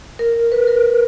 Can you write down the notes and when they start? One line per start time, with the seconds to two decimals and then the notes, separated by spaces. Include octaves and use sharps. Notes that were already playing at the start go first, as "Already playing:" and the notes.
0.19 A#4
0.52 B4
0.67 A#4